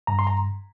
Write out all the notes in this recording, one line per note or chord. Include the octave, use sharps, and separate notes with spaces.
G2 A#5
C6
A#5